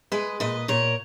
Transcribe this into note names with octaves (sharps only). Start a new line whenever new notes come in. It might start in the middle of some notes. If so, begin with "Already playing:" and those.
G#3 B4 D#5
A#2 B4 D#5
A#2 A#4 C#5